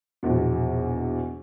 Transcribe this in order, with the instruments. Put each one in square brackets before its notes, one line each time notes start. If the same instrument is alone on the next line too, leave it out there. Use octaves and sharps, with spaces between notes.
[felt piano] A#1 E2 B2